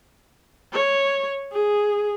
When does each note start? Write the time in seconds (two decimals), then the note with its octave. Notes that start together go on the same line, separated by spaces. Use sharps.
0.73 C#5
1.52 G#4